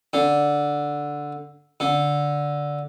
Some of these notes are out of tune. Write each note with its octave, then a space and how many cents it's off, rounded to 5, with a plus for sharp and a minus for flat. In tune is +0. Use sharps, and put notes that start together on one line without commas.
D3 -5
D3 -10